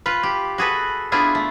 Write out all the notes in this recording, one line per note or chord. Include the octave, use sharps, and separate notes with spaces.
F4 B4
G4
F#4 G#4 A4 B4
B3 D4 E4 F4 G#4
A3